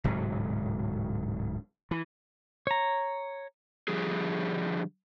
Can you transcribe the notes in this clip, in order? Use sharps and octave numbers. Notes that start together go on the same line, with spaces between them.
D1 G#2 C3 F#3
E3
C#5 A#5
D3 F3 G3 G#4